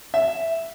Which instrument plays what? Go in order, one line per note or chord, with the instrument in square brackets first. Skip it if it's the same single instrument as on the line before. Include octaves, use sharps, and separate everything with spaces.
[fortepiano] E5